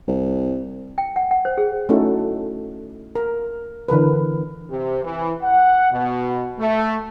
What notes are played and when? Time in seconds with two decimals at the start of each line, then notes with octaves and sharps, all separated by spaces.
0.08 C2
0.98 G5
1.16 F#5
1.31 F#5
1.45 C5
1.57 G#4
1.89 A3 C#4 D#4 E4 F#4 A4
3.15 A#4
3.88 D3 E3 A#4 B4
4.70 C3
5.04 E3
5.42 F#5
5.92 B2
6.59 A3